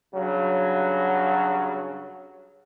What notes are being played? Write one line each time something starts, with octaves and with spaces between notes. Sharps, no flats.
G2 C#3 F#3